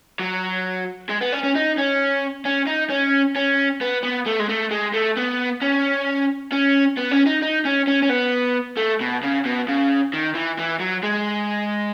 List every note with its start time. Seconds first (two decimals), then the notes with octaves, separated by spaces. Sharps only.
0.19 F#3
1.09 G#3
1.21 B3
1.33 C#4
1.43 C#4
1.55 D#4
1.78 C#4
2.45 C#4
2.67 D#4
2.90 C#4
3.36 C#4
3.81 B3
4.03 B3
4.26 A3
4.39 G#3
4.49 A3
4.71 G#3
4.94 A3
5.17 B3
5.61 C#4
6.52 C#4
6.97 B3
7.11 C#4
7.26 D#4
7.42 D#4
7.65 C#4
7.87 C#4
8.03 C#4
8.09 B3
8.77 A3
9.01 B2
9.23 C#3
9.45 B2
9.68 C#3
10.14 D#3
10.35 E3
10.59 E3
10.80 F#3
11.03 G#3